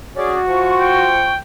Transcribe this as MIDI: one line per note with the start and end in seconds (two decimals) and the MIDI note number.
0.16 0.39 61
0.16 1.12 66
0.16 0.39 68
0.16 0.39 74
0.48 1.31 53
0.48 1.31 65
0.48 1.31 85
0.80 1.40 79